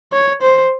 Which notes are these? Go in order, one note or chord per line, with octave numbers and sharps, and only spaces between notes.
C#5
C5